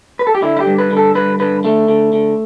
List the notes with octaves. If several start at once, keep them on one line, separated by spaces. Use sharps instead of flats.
B4
A4
G4
D3 E4
E4
G4
G2
B4
D3
A4
G2 B4
D3 B4
D3 A3
D3
D3